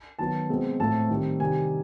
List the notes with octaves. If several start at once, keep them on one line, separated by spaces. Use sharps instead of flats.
D#3 F#3 B3 A5
B2 G#3 C4
A2 F3 A3 C4 A5
D#3 G3 C4
C3 D#3 G3 C4 G#5